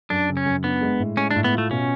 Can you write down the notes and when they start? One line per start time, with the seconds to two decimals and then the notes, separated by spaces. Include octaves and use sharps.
0.10 F#2 D4
0.29 C#3
0.37 C#4
0.46 F#2
0.64 B3 D4
0.81 G#3
0.99 A2
1.17 G#3 C#4
1.31 D4
1.36 A2
1.44 B3
1.54 A3 F4
1.71 B2 C#4